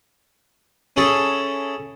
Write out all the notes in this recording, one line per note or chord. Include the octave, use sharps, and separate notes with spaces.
C#4 E4 G#4 A4